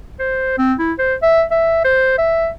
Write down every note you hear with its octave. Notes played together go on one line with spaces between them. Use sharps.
C5
C4
E4
C5
E5
E5
C5
E5